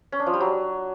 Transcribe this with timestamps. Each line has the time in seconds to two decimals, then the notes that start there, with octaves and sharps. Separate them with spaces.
0.12 C#4
0.19 D4
0.26 F3
0.34 G3
0.41 F#3